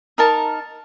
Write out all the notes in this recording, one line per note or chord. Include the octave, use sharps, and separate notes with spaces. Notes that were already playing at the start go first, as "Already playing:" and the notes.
D#4 A#4 A5